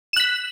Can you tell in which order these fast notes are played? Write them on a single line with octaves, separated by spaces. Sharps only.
E7 F#6 B6